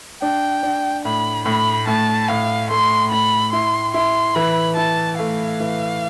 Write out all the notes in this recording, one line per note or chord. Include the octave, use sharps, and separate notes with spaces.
D4 G5
D4
A2 B5
A2 B5
A2 A5
A2 F5
A3 C6
A2 B5
E4 C6
E4 C6
E3 B5
E4 A5
A3 F5
E3